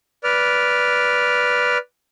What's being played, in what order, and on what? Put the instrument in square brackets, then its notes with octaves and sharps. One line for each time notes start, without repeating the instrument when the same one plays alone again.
[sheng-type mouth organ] B4 D5 F6